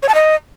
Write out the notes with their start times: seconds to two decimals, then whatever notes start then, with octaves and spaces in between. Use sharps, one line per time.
0.03 C#5
0.09 A5
0.15 D#5